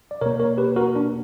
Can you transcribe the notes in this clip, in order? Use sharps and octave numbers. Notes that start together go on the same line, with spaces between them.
D5
B2 A#3 A#4 C#5
A#4 C#5
G4 B4
F#4 A#4
D4